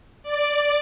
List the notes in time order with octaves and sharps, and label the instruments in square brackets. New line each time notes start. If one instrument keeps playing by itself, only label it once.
[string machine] D5